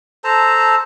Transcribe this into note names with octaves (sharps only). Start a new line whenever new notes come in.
A4 C5 A5 A#5